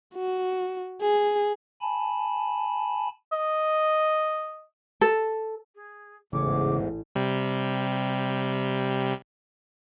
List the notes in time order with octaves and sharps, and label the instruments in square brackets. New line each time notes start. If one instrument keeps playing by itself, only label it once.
[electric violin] F#4
G#4
[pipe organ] G#5 A5 B5
[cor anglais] D#5
[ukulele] A4
[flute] G#4
[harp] A1 C#5 [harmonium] E2 G#2 [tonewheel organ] C#3 [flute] D6
[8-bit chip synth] C3 G3